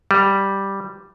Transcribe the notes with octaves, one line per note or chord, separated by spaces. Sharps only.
G3